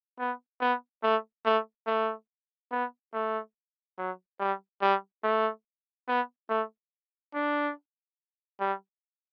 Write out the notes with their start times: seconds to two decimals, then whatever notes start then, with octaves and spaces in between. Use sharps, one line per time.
0.19 B3
0.61 B3
1.03 A3
1.45 A3
1.87 A3
2.72 B3
3.13 A3
3.98 F#3
4.40 G3
4.82 G3
5.24 A3
6.08 B3
6.50 A3
7.34 D4
8.60 G3